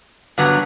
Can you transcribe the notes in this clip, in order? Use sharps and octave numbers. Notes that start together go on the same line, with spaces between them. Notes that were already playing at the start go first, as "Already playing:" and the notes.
G2 D3 F#3 B3